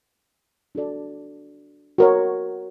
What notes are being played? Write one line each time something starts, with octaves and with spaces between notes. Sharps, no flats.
D4 F#4 A4 D5
F#4 A#4 C#5